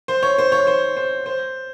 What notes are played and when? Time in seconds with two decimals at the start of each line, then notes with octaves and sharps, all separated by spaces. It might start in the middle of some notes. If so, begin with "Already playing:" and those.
0.08 C5
0.23 C#5
0.38 C5
0.52 C#5
0.67 C5
0.97 C5
1.26 C5